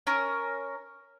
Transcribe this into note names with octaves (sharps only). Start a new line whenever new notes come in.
C#4 A#4